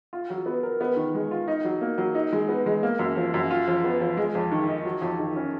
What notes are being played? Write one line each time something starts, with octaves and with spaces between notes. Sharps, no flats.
F4
F#3
B3
A#4
B3
D#3
G#3
F4
D#4
F#3
A#3
F#3
D#4
G#3
B3
G#3
A#3
F#2
F3
F#2
F4
F3
B3
F3
G#3
F2
D#3
D#4
F#3
F2
D#3
C#4